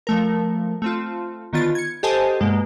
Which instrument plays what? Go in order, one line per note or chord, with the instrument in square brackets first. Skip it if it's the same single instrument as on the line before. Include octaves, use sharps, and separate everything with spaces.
[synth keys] F3 A3 A#4
A3 C4 F4
D3 D#3 B3 F4 A6
G#6 C#7
G4 A4 C5 D#5 G#5 A5
G2 B2 G#3 A#3